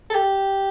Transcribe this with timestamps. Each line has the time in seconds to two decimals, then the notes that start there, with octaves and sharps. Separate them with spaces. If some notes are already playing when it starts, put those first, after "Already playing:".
0.10 A4
0.14 G4